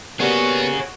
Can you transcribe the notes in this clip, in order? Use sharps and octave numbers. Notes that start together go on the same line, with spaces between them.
G3 A#3 B3 C#4 F#4 G#4 C#5